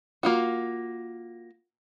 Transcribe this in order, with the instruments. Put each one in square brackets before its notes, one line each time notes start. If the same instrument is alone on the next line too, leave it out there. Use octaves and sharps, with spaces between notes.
[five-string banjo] A#3 F4 F#4